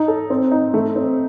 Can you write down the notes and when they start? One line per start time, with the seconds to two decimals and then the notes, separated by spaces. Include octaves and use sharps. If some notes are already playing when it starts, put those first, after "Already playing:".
Already playing: D#4
0.08 A4
0.30 C4
0.51 D#4
0.74 A3
0.96 C4